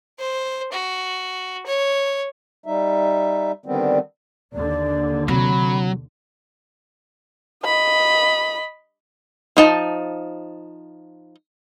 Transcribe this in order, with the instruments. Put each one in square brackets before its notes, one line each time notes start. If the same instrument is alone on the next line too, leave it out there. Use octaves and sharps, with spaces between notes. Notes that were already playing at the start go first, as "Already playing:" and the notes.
[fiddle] C5
F#4
C#5
[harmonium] G3 D#4 E5
D3 D#3 G3 B3 C4
[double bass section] D#2 D3 [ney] D5
[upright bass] C3 [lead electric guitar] F#3 [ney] B5
[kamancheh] D#5 B5
[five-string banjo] F3 D#4 A5